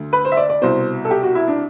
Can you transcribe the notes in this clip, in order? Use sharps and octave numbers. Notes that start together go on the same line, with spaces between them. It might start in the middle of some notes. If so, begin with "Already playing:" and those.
Already playing: D2 D3
B4
C5
E5
D5
D5
C2 B2 C5
A4
G4
F#4
E4
D4